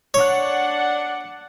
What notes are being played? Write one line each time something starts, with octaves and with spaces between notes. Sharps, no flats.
D4 C#5 D5 F#5